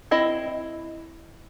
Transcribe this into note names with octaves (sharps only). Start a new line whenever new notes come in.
C4 E4 D#5